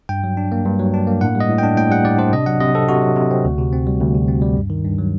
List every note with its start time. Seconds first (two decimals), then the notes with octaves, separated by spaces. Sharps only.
0.09 G2 G5
0.24 F#3
0.37 D4
0.52 A#3
0.66 G2
0.79 F#3
0.94 D4
1.07 A#3
1.21 A2 F#5
1.35 G3
1.40 D#5
1.49 A2
1.58 D4 G5
1.77 A2 G5
1.91 G3 F#5
2.05 A2 D5
2.18 D4 C5
2.33 C3 D#5
2.46 F#3 F#5
2.60 C3 D#5
2.74 C4 A4
2.89 C3 F#4
3.02 F#3
3.17 C3
3.31 C4
3.45 D2
3.58 C3
3.72 C4
3.87 G3
4.00 D2
4.15 C3
4.28 C4
4.42 G3
4.56 G2
4.70 D#3
4.85 G2
4.98 F#3